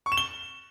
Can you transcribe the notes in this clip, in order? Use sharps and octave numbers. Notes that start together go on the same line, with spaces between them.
C#6
E7
G7